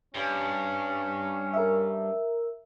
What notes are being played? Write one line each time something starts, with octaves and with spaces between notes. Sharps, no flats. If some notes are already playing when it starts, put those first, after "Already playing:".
G2 C#4
A#4 E5